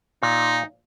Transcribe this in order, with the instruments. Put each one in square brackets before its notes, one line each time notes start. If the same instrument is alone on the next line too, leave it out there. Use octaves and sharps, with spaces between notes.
[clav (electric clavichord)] A#2 [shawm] D#4